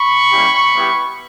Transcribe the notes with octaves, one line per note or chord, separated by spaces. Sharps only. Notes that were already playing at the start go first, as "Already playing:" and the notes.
Already playing: B5 C#6
G3 A#3 C#4 E4 G4
G3 B3 E4 G4